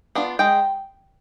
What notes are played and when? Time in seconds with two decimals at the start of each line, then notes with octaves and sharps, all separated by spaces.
0.15 B3 D4 F4
0.39 G#3 G5